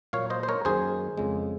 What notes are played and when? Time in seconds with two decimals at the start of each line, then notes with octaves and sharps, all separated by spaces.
0.13 A#2 F#3 A#3 C#5 F5
0.30 C5 D#5
0.43 C5
0.49 A#4 C#5
0.65 F#2 D#3 A#3 G#4 C5
1.17 F2 C#3 G#3